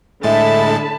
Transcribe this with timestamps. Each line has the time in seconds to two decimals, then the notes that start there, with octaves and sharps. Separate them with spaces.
0.23 A2 D3 G#3 E5 A5 B5 A6